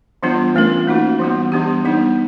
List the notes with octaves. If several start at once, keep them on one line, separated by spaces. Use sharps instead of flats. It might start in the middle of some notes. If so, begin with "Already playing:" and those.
E3 G3 B3 D4 F4
E3 A3 C#4 F4 A#4
A#3 D#4 F#4
E3 G3 B3
E3 G3 B3 D4 G4
G3 B3 D#4